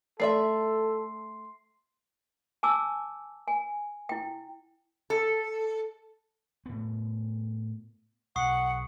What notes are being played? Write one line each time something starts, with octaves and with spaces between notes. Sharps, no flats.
A3 A4 D5 E5 C6 C7
G#5 A5 D6 E6
G#5
E4 G5
A4
A2 B3
B1 F#5 C#6 D#6 C7